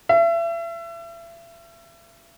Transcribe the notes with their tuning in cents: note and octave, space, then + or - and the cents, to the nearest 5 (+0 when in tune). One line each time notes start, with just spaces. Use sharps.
E5 +35